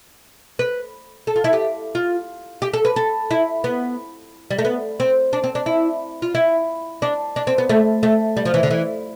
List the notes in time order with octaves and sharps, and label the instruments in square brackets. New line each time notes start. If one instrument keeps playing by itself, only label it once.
[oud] B4
A4
F4
E4
G4
F4
G4
A4
B4
A4
E4
B3
G3
A3
B3
C4
D4
C4
D4
E4
F4
E4
D4
D4
C4
B3
A3
A3
G3
F3
E3
D3
E3